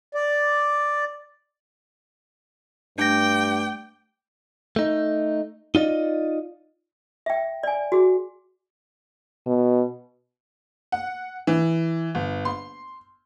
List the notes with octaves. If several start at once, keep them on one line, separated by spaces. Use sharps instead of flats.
D5
G2 A3 D4 G5 D6 A#6
A3 D#4
D#4 F4 D5 D#5
E5 G5
D5 G#5
F#4 G#4
B2
F#5
E3
G1
C6